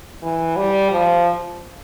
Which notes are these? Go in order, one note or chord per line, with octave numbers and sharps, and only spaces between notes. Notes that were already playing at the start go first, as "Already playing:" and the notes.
E3
G3
F3